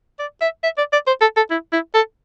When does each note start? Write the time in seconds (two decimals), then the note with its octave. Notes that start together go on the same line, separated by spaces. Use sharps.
0.19 D5
0.41 E5
0.63 E5
0.78 D5
0.93 D5
1.07 C5
1.21 A4
1.37 A4
1.51 E4
1.72 E4
1.94 A4